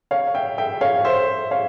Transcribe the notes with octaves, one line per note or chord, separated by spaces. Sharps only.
C#5 F5
E5 G5
E5 G5
C#5 F5
C5 E5
C#5 F5